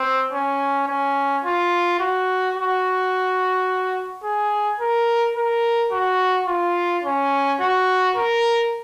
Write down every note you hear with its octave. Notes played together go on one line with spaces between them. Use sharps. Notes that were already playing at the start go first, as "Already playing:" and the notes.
Already playing: C4
C#4
C#4
F4
F#4
F#4
G#4
A#4
A#4
F#4
F4
C#4
F#4
A#4